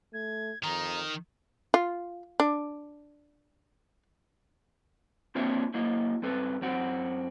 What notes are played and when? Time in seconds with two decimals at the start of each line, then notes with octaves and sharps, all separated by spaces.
0.14 A3 G#6
0.63 F2 D#3 A#5
1.74 F4
2.40 D4
5.35 A#3 C4 D4 F4 C#5 E5
5.74 F#3 A#3 E4 D#5
6.22 G2 C4 A4 B4
6.62 F#2 C4 F#4